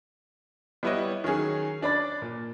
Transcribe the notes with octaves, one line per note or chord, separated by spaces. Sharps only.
G3 B3 E4 B4 C#5 D#5
D#3 F#3 C#4 G#4
C#4 D4 D5 B5 A6
A#2